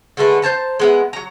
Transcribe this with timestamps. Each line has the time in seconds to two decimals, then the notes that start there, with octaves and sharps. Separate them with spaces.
0.17 D3 G#3 A3 B4
0.42 C5 C#5 A5 A#5
0.79 G#3 B3 E4
1.13 F#3 A#5